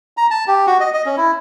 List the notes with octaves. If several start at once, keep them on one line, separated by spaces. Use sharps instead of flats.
A#5
A5
G4
F#4
D#5
D#5
C#4
E4